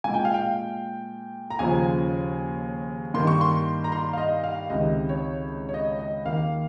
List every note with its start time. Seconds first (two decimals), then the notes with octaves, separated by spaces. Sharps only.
0.04 A#2 G#3 G#5
0.14 G5
0.25 F5
0.34 G5
1.50 A#5
1.59 D#2 C#3 F3 G#5
3.14 G2 D#3 A#3 C6
3.27 C#6
3.41 C6
3.84 A#5
3.92 C6
4.13 F5
4.17 D#5
4.44 F5
4.69 C#2 C3 D#3 D#5
5.09 C#5
5.69 C#5
5.74 D#5
5.99 D#5
6.25 D#2 D#3 A#3 F5